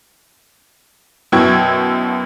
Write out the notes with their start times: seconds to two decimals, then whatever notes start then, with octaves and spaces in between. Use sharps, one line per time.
1.32 F#2 B2 E4 G5 C#6 G#6